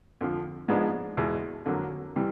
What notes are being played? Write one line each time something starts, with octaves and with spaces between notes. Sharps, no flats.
F2 D3 F3
G#2 F3 G#3 B3 D4
E2 B2 G#3
F2 D3 F#3 A#3
C3 E3 G3